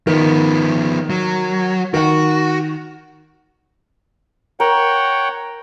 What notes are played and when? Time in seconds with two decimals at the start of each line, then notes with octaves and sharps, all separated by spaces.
0.07 D#3 F3 B3
1.10 F#3
1.94 D#3 F#4 F#5
4.60 A#4 C#5 F#5 G5